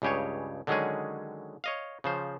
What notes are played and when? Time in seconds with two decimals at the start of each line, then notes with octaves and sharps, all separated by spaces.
0.02 C#2 G2 C#3 G4 G#4 C#5
0.67 D3 D#3 F#3 G#3 C#4 G#4
1.64 C#5 D#5 F5
2.04 C#3 F3 C5